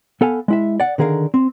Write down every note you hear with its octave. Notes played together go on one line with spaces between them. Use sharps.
B3 A4 F5 G#5
G#3 E4 E5
D5 F#5
D3 D#3 G#4 A#4 F5
C4